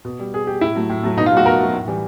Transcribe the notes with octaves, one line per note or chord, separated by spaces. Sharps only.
B2
G3
B2 G#4
G3 G4
A2 E4
F#3 A3
A2
F#3 A3
B2 D#4
F4
F#3 A3 F#4
B2 A#4
F#3 A3
A2
E3 G3